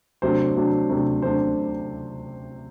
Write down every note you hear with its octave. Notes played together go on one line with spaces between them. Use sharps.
C3 F#3 A3 D4 C5
C3 F#3 A3 D4
C3 F#3 A3 D4
C3 F#3 A3 D4 C5